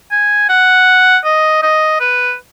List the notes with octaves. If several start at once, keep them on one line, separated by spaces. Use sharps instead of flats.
G#5
F#5
D#5
D#5
B4